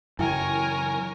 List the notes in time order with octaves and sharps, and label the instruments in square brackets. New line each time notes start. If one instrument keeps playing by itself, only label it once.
[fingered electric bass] F#2 C#3 E3 [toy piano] E4 G5 [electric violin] A#4 C#5 [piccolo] G#5